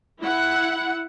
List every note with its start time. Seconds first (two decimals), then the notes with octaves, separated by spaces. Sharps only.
0.21 E4 F#5